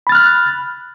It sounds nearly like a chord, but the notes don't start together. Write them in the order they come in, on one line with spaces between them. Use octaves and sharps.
B5 A6 F6 F#6